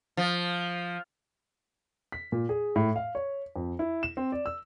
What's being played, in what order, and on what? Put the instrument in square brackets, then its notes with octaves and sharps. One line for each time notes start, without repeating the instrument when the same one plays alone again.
[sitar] F3
[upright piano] B6
A#2
G#4
A2
F5
C#5
F2
E4
E7
C4
D5
E6